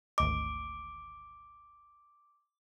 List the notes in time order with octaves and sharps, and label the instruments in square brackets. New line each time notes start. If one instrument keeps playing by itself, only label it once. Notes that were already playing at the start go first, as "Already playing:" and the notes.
[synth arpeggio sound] G#1 D2 D#5 [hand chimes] D6